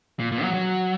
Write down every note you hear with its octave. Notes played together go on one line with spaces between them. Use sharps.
A#2
A#2
F#3
F#3